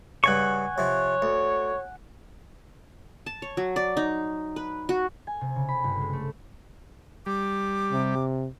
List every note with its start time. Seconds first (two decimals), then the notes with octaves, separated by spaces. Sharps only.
0.24 G2 C#3 F#5 G#5 C#6
0.78 C3 F3 C#5
1.22 D2
3.26 A5
3.42 C#5
3.57 F#3
3.76 D5
3.97 D#4
4.56 B4
4.89 F#4
5.27 G#5
5.41 C3
5.56 C#3
5.69 B5
5.84 G1
6.01 G#3
6.13 A3
7.26 G3 D6
7.93 C3